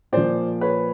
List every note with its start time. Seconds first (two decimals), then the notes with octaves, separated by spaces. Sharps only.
0.12 A#2 F3 C5 D5
0.61 B4 C#5